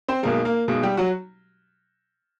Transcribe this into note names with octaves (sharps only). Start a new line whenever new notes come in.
C4 C5
B1 B2 G#3 A#3 A#4
A#3 A#4
B1 B2 G#3
G3 G4
F#3 F#4